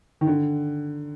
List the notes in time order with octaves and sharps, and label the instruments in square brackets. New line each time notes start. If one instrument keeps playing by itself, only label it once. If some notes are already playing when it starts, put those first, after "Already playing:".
[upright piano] D#3
D3